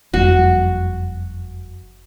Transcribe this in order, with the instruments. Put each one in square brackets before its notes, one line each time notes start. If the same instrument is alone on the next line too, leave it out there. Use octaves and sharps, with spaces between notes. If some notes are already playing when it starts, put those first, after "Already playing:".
[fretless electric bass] F#1 F2 G3 [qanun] F#4